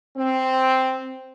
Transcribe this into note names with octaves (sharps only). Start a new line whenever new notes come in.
C4